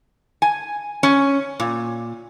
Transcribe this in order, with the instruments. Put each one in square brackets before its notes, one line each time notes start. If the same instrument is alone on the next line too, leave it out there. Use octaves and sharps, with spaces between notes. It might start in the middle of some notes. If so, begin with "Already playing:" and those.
[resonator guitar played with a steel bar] G#5
C#4
A#2